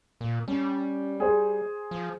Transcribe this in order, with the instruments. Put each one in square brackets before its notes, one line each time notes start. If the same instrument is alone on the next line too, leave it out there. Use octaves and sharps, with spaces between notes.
[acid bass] A#2
[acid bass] G3 [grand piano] C#4
[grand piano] G#4 C5
[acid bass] F3